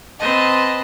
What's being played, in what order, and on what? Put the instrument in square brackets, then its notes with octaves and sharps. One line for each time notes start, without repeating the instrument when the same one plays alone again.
[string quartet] C4 B4 C5 D#5 A5